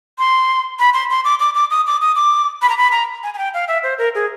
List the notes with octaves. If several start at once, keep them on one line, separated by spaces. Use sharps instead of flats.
C6
B5
C6
C6
D6
D6
D6
D#6
D6
D#6
D6
B5
A#5
B5
A#5
G#5
G#5
G5
F5
E5
C5
A#4
G#4